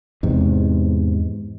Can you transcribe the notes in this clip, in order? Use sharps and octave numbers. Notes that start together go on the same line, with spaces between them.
E2 G#2 C3